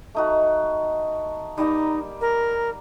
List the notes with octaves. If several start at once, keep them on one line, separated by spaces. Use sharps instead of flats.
A3 D#4 F#4
G3 A#3 D#4
A#4